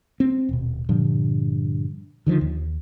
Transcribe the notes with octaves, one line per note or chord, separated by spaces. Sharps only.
C4
D#1 B2
G2 A#2 D3 F3
D3 D#3 F3
D#2